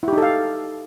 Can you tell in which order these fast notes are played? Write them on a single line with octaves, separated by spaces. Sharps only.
E4 G4 D#4 A4 F5